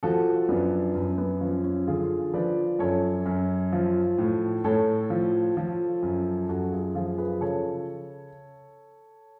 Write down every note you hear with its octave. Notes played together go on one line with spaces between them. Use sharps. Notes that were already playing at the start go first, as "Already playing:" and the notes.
F3 F#4 A4
F#2 B3 D4
F#2
B3
F3 C#4
C#4
D3 F4 G#4
F3 B4 D5
F#2 A4 C#5
F#2
F3
A2
A2 A4 C#5
F3
F3
F#2
F#2 F#4 A4
F4 G#4
F3 F4 G#4
G#4 B4
C#3 A4 C#5